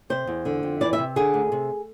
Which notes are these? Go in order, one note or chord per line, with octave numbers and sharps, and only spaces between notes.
C3 C5
E2
D3
F2
E3 D5
E5
C3
D3 G#4
D2
C3